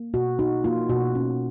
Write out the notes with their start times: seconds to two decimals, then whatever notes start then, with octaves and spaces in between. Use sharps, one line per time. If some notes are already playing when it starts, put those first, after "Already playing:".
Already playing: A#3
0.14 B2 F#4
0.39 D#4 F#4
0.64 A#3 F4
0.90 B2 F#4
1.15 C#4